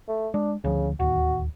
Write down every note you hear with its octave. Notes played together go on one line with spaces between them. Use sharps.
A3
G#3 D4
D2 C#3 F3
D1 D#2 F#4